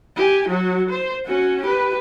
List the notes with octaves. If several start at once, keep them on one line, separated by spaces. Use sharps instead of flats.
G4 G#5
F#3 F#4
C5
C#4 F#4
G4 B4